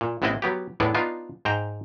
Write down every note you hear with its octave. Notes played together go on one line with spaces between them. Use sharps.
A#2
A1 C3 B3 C4 E4 D#5
F#3 B3 G4
E2 A2 B3 D4 E4
B3 D4 D#4 F4
G#2 C5 G5 A#5